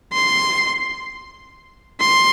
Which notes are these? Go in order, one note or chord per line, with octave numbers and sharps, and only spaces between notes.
C6
C6